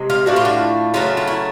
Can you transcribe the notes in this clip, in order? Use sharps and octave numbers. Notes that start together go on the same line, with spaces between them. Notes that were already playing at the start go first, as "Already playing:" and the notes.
Already playing: C3 G#3
F4
A2 F3 A3 D4 F#4
F4
F#4
C#3 F#3 A3 F4
F4
E4